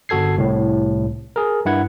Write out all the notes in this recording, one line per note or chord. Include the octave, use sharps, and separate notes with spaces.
G1 F#4 A4 G#6 C7
C2 A2
G#4 A#4
G2 E4 F#5 G#6